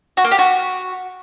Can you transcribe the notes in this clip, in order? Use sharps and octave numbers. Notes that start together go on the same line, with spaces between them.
F#4
A#3
G4
F#4